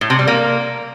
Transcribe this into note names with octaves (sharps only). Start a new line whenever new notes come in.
A2
C3
G3
A#3